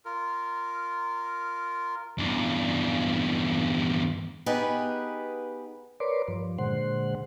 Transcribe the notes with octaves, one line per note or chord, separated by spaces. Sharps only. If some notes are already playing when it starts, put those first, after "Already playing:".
F4 A#4
E2 G2
B3 D#4 G4 G#4 B4
A#4 B4 C#5 D5 C6 D6
G2 F3
A#2 D3 G#3 C5 F#5 C6